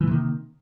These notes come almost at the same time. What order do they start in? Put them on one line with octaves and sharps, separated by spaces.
E3 A#3 C3 D#3